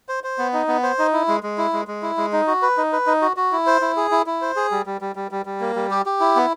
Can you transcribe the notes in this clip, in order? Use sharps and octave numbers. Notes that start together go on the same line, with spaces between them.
C5
C5
B3
D#4
B3
C5
D#4
E4
G#3
G#3
E4
G#3
G#3
E4
G#3
D#4
F#4
B4
D#4
B4
D#4
F#4
F#4
E4
C5
E4
G#4
E4
E4
C5
G#4
G3
G3
G3
G3
G3
G3
A#3
G3
G4
G4
E4
B3